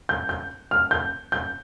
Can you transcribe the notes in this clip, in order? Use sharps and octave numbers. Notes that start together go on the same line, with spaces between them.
G6
G6
F6
G6
G6